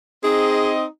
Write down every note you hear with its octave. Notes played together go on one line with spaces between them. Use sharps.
C4 D#4 G#4 D#5